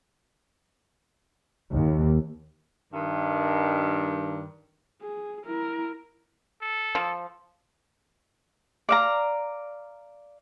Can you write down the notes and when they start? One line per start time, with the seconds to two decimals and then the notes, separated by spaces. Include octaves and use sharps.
1.71 D#2
2.93 G2 D#3
5.02 G#4
5.45 E4 A#4
6.62 A4
6.95 F3
8.89 D5 F5 A#5